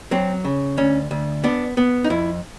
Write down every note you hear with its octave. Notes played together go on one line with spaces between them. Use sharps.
F#3 C4
C#3
D2 C#4
D2
B3 D4
B3
D#4
F2 E4